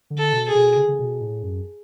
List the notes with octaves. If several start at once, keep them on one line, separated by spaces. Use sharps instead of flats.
D3
A4
B2
G#4
B2
C#3
C#3
B2
A2
F#2